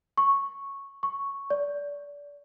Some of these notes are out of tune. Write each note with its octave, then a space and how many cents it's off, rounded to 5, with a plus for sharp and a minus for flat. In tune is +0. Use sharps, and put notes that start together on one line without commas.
C#6 -5
C#6 +0
D5 -25